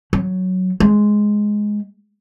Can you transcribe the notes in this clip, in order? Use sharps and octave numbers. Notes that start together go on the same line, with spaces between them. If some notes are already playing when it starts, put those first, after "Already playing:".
F#3
G#3